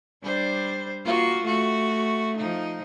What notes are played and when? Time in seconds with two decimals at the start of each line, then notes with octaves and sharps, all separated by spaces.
0.24 G3 D4 C5
1.05 A#3 F4 F#4
1.45 A3 F#4
2.37 F3 D#4